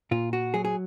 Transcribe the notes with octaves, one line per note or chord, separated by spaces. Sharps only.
A#2 F4
F#4
F#3 G#4
G#4